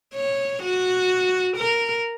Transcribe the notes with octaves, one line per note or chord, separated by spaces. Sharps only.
C#5
F#4
A#4